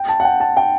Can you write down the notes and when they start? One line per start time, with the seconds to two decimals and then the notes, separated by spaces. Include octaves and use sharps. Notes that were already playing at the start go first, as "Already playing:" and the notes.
Already playing: G5
0.09 A5
0.20 F#5
0.25 G5
0.40 A5
0.57 G5